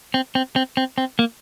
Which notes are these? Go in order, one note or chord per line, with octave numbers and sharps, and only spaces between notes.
C4
C4
C4
C4
C4
A#3